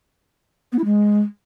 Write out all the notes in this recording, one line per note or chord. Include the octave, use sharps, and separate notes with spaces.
B3
E4
G#3